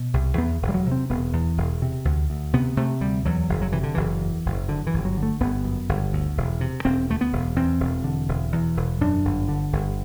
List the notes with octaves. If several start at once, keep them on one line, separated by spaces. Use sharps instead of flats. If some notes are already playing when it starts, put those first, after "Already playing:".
Already playing: B2
C2
E2 B3
E1
G3
F#3
C3
C4
E1 B3
E2
E1
C3
D2
D2
C3 B3
C3 A3
D2 G3
E2 F#3
F#1
F#3
C3 E3
D3
F#1 E3
E2
F#1
F#2 D3
E3
G1
F#3
D3
A3
G1 B3
F#2
G1
D2
E1
C3
E1 C4
D2 A3
B3
E1
E2 C4
E1
D3
E1
E2
E1
F#2 D4
G1
D3
G1